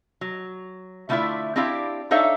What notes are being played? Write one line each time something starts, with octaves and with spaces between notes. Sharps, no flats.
F#3
D3 A3 E4 F4 D5 E5
C4 D4 E4 G4 D5 F5
D4 D#4 A4 C#5 E5 F5